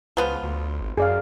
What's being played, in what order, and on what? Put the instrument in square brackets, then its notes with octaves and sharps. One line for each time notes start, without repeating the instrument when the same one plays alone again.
[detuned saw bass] C#2 [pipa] F3 B3 F4
[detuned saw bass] D2
G#1
[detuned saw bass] F#2 [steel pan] G#4 D5 F5